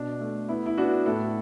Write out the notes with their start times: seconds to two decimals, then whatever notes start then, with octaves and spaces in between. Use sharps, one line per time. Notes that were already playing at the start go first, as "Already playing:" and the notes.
Already playing: B2 D4
0.20 A3
0.49 B3 E4
0.66 E4
0.78 B3 D4 F#4
1.06 A2 E4 A4